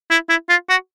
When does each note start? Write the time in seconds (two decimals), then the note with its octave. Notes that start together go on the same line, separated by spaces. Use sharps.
0.11 E4
0.29 E4
0.49 F4
0.69 F#4